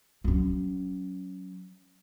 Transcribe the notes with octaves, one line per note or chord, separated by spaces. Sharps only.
F#3 C#4